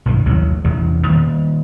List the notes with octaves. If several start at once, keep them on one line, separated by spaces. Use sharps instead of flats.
B1 G2 D#3 E3
A1 D#2 C3 F#3
A1 E2 C3 E3
D#3 G3 A3 A#3